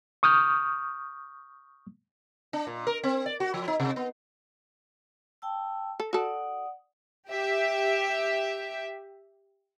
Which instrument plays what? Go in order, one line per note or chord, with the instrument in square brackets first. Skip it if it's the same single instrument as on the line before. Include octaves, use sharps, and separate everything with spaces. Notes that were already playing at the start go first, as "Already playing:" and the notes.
[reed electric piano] C#6 D#6 F6 G6
[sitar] D4
A#2
A#4
C4
D5
F#4
F3
D#4
C3
B3
[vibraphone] G5 A5 E6
[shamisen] A4
[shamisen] F#4 A4 [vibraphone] D5 F#5 D#6
[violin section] G4 E5